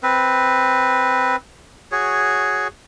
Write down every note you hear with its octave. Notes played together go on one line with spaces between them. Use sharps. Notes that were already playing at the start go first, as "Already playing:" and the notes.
C4 B4
F#4 G#4 C#5